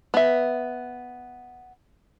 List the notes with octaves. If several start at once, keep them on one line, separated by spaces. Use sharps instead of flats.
B3 E5